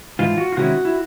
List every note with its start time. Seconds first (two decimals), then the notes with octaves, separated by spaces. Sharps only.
0.19 G#2 E3 F4
0.38 F#4
0.53 F4
0.57 C3 D#3 G#3 C#4 E4 F#4
0.85 E4